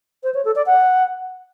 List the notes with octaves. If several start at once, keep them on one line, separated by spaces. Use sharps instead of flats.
C5
C#5
A4
D5
F#5